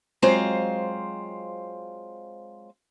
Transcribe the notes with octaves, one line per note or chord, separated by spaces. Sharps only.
F#3 G#3 C4 F4 C5 F5